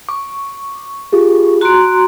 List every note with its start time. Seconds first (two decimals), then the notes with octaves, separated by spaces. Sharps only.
0.09 C#6 D6
1.12 F4 G4 G#4
1.61 F#4 A#5 C6 F#6 D7